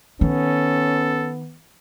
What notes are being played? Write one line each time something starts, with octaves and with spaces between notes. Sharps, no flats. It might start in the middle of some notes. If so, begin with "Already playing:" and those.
D#3 B3 C#4 A4